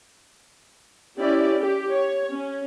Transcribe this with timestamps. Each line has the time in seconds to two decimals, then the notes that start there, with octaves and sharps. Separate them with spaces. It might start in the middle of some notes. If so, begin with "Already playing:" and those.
1.19 C#4 E4 G4 D5
1.60 G4
1.91 C#5
2.32 C#4